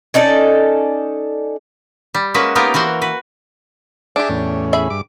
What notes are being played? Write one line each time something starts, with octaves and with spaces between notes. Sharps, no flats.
C#4 D#4 A4 D5
G3
G#3 A#3 C#4 F#4 B4 E5
A#3 B3 D#4 F4 G4 A#4
E3 F#4 A#4 C5
F#4 B4
D4 G4 G#4 E5 D6
E2 A2 C#4
G#4 E5 B5
G2 D6